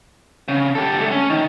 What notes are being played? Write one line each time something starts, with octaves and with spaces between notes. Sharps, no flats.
C#3
G4 A4
D2 A3
C#4
D#3